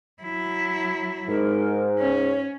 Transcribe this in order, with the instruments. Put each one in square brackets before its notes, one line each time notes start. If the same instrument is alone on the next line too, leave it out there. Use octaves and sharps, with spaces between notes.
[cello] F#3 E4
[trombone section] G#2 [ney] A#4
[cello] C#4 [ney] C#5